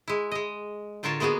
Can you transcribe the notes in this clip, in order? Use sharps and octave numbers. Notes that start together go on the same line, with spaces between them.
G#3 E4
G#3 D#5
A2 D3 F4 A#4 C#5 A5
G#3 A#3 B3 F#4 G#4